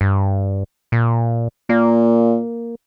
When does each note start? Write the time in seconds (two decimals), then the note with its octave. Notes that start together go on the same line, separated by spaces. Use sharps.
0.01 G2
0.92 A#2
1.69 A#2 A#3